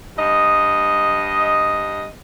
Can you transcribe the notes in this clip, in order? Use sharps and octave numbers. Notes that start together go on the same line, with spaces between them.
G2 D#5